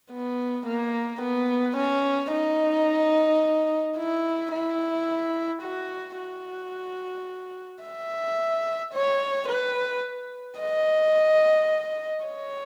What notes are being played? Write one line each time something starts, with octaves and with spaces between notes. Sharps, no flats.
B3
A#3
B3
C#4
D#4
E4
E4
F#4
F#4
E5
C#5
B4
D#5
C#5